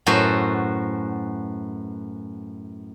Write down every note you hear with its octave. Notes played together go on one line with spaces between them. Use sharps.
F#2 A2 F#4 A4 B4 C5